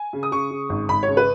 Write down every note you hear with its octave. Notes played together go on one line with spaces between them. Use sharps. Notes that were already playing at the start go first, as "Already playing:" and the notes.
Already playing: G#5
C#3
D#6
C#3 C#6
C#3
G#1
G#1 B5
C#3 C#5
B4